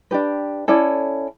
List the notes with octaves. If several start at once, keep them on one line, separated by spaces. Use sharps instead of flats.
D4 G4 B4
C#4 E4 A4 D5